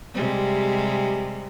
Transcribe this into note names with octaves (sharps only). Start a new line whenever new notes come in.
C3 G3 G#3